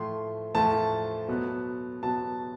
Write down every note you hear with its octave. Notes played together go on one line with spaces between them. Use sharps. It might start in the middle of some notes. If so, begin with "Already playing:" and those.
Already playing: A2 F3 A3 C6
A2 F3 A3 A5
B2 F#3 B3
B2 F#3 B3 A5